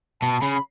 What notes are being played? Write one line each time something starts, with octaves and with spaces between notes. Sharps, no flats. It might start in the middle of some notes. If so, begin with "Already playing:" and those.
B2 A5
C#3 B5
B5